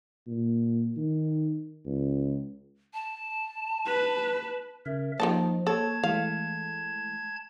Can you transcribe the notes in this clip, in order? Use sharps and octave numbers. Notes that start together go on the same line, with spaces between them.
A#2
D#3
C#2
A5
B4
C#3 A#4 E5
D#3 F3 A#3 D#4 F4 A5
A#3 A4 C#5 A5 G#6
E3 G#3 A3 F5